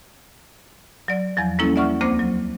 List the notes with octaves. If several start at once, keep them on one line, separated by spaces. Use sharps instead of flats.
F#3 D5
E2 F3 F#3
G3 A#3 C#4 E4 A4
D5 E5 F#5 C#6 F6
D2 A#3 C4 C5 D6 A#6
F#3